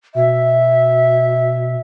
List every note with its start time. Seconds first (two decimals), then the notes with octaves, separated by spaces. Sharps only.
0.15 B2 E5